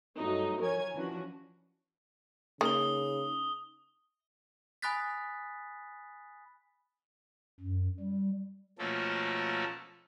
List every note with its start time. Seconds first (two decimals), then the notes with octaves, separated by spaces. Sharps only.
0.17 G2 F#3 A3 D#4
0.59 F3 A#4 C#5 G#5 G#6
0.95 E3 F3 C#4 D4 F#4
2.61 C#3 A#3 D#4 D#6 G7
4.82 G#5 B5 D#6 F#6 A6 B6
7.60 F#2
8.00 G3
8.79 B2 F3 A3 A#3 C#4 A4